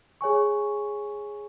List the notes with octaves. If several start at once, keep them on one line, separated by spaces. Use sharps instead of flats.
G#4 C#5 G#5 C#6